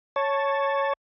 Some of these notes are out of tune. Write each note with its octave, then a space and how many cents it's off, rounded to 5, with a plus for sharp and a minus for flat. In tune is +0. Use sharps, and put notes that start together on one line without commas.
C#5 +0 A5 +0